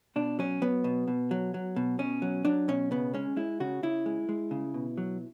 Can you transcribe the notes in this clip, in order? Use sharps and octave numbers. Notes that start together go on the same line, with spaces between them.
B2 D4
F#3 C#4
F#3 B3
B2
B2
F#3
F#3
B2
B2 C#4
F#3
F#3 D4
B2 C#4
C#3 B3
G#3 C#4
G#3 E4
C#3 F#4
C#3 E4
G#3
G#3
C#3
B2
F#3